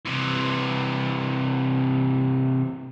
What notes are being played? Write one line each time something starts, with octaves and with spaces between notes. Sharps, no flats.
C3 E3